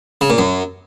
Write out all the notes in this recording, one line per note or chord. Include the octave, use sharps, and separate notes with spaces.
C#3
A#2
F#2